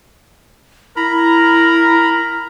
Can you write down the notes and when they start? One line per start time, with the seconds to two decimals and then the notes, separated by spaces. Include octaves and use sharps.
0.96 E4 A#4 A#5 B5